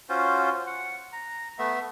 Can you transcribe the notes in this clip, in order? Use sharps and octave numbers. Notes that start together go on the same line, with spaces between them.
C#4 F4 F#4 C5
F#5
A#5
A3 B3 E5